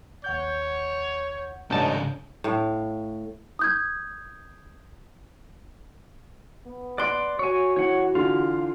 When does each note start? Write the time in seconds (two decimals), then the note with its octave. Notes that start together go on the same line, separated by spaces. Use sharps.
0.24 D#2 C#5 F#5 G6
1.71 A1 G#2 C#3 D4 D#4 A5 G6
2.44 A2 F5
3.59 D#6 G6 G#6
6.66 B3
6.98 D5 C6 F#6 D7
7.39 F#4 C#5 G#5
7.76 E3 C#5 F#5
8.15 D3 E3 F4